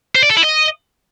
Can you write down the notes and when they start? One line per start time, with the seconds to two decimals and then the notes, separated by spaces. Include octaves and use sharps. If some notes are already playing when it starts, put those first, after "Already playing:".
0.15 C5
0.23 D5
0.30 A4
0.37 E4
0.44 D#5